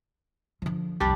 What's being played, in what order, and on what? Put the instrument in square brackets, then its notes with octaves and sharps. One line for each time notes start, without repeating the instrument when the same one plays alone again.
[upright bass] D3 F3
[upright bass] C2 F2 [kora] G3 D4 G4